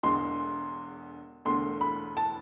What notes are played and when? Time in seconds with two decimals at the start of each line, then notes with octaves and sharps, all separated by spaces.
0.03 E1 E2 D3 G#3 C6
1.45 E1 E2 D3 A3 C6
1.81 B5
2.17 A5